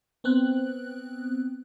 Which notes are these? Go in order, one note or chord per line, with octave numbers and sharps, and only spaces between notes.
B3 C4 F#6